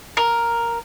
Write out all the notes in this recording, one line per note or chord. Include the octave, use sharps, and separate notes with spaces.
A#4